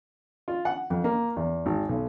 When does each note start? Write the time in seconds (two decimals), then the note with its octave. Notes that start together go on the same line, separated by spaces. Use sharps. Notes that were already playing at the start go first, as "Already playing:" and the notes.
0.48 F4
0.65 F#5
0.90 F2
1.04 A#3
1.37 E2
1.66 G#1
1.89 B1